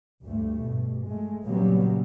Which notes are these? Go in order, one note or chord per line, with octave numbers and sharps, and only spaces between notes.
D2 G2 A3
G2 B2
G#3 A3
A#2 C#3 F#3 G3 A#3 B3